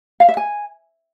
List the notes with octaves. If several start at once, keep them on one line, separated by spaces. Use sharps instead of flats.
F5
E5
G#5